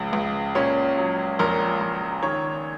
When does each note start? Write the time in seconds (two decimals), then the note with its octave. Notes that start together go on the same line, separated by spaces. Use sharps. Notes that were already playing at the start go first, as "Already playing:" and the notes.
Already playing: C#2 C#3 F3
0.13 C#2
0.55 A#2 C#4
0.98 F#3
1.39 A#1 A#4
1.81 A#1
2.23 D#3 C#5